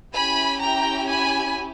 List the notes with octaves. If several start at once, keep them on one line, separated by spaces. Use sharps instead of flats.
C#4 E4 G4 G#5 B5
G5 A#5
G#5 B5